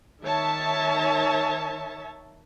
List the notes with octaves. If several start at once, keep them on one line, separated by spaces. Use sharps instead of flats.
D#3 C#5 E5 A5